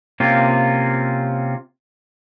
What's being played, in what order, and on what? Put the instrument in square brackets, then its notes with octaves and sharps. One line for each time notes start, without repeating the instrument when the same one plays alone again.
[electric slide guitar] C3 A#3 C4 C#4 F4